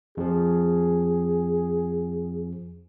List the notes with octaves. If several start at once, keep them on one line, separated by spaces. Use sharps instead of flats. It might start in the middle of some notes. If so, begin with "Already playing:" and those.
F2 F3 G#4